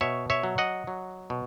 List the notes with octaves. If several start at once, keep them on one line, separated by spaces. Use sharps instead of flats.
B2 C#5 E5
C#5 E5
F#3
D#5 F#5
F#3
B2